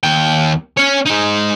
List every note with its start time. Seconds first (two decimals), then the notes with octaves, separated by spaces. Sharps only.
0.04 D#2 G5
0.77 C#4 C#5
1.05 G#3 D#4